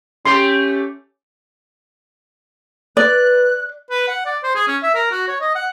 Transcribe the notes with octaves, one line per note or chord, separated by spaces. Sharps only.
A3 C#4 G4 C6
B4 D5 F#6
B4
F#5
D5
C5
G#4
C#4
E5
A#4
F#4
C#5
D#5
F#5